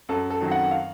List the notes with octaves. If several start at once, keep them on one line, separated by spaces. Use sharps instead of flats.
F#2 A4
A4
D#3 F#3 C4
F#5
F5